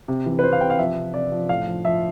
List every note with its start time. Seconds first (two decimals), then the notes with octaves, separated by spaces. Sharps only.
0.08 C3
0.26 E3
0.39 B4
0.43 E3 C5
0.52 F5
0.61 C3 G5
0.70 F5
0.78 F3 E5
0.96 C3
1.14 C3 D5
1.32 F3
1.49 A2 F5
1.67 F3
1.85 F3 E5